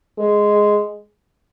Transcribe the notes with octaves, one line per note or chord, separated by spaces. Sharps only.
G#3